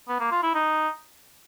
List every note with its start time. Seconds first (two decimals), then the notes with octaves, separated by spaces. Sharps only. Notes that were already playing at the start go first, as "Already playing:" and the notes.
0.08 B3
0.20 A#3
0.31 F4
0.43 E4
0.55 D#4